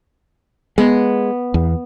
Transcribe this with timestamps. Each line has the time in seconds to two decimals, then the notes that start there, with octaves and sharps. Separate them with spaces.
0.78 G#3 B3
1.54 E2